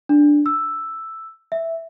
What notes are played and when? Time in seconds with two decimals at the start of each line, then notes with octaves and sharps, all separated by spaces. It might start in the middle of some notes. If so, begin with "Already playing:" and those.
0.09 D4
0.46 E6
1.52 E5